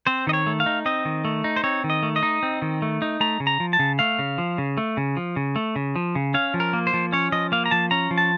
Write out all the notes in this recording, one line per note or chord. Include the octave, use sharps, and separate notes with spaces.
C4 C5
D#3 D#5
C#5
A3
F5
D#4
C4 D#5
D#3
A3
D#4
C5
C4 C#5
D#3
D#5
A3
D#5
D#4
C4
D#3
A3
D#4
A3 A#5
C#3
A#5
F3
A5
C#3
A3 F5
C#3
F3
C#3
A3
C#3
F3
C#3
A3
C#3
F3
C#3
C#4 F5
F3
A#4
A#3
C5
F3
C#4 C#5
F3 D#5
A#3 F5
A#5
F3 A5
C#4 A#5
F3
A5